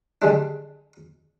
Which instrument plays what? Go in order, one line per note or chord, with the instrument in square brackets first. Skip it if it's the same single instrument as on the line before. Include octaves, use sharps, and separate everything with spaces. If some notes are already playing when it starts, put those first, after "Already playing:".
[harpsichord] D3 G3 G#3 D4